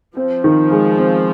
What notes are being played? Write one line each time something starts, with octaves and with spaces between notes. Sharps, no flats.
F3 C4
D#3
G#3
C4